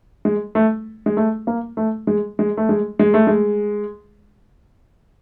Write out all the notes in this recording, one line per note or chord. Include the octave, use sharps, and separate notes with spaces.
G#3
A3
G#3
A3
A#3
A3
G#3
G#3
A3
G#3
G#3
A3
G#3